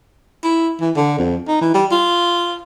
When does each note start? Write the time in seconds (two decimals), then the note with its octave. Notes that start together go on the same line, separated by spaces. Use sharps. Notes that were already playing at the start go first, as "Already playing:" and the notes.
0.44 E4
0.81 E3
0.96 D3
1.18 F2
1.48 D#4
1.62 E3
1.74 G3
1.92 F4